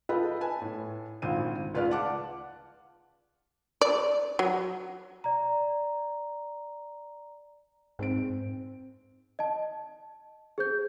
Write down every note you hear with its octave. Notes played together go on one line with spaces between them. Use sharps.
F4 A4 B4 D#5 G5 B5
B4 G#5 A5
A2
G#1 D2 A#2 C5 F5 D#7
C#2 F4 B4 D5 F5 F6
F5 F#5 A5 D6 F#6
D5
F#3
D5 A#5
G#2 C4 C5 D7
D#5 A5
G#4 C5 G6